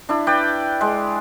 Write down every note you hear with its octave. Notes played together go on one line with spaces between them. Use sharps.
D4 E4
B4 D5 G5
G#3